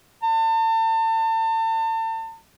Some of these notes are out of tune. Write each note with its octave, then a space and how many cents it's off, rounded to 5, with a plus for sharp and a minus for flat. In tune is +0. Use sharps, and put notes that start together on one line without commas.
A5 +35